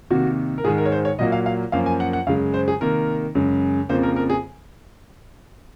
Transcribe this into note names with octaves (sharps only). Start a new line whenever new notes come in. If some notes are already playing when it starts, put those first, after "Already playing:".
C3 D#3 A#3 F#4
A#4
G#2 D#3 G#3 G#4
A#4
C#5
C5
C#5
A#2 F#3 A#3 D#5
F5
F5
F#2 F3 A#3 F5
G#5
F#5
F#5
F#2 C#3 G#3 F5
C5
G#4
C3 D#3 A#3 A#4
F#2 C#3 G#3
F2 C#3 F3 A#3 C5
A#4
A#4
G#4